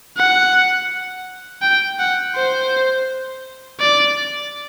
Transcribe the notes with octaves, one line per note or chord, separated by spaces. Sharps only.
F#5
G5
F#5
C5
D5